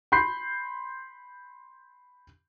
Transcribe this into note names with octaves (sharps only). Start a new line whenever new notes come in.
B5 C6 G6 C7